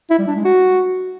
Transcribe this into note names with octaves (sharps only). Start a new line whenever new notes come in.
E4
G3
D4
G#3
F#4